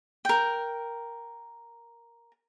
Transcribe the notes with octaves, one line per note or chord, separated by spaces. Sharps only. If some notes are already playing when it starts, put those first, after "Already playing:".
A#4 G5